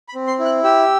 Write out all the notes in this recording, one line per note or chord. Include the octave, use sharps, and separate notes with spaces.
B5
C4
C6
E4
F#6
G4 E6